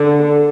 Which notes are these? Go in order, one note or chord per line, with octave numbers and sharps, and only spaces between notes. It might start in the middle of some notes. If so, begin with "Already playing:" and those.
Already playing: D3